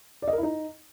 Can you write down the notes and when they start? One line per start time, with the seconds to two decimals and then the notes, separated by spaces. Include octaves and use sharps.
0.22 D5
0.28 D#5
0.33 A#4
0.38 E4
0.43 D#4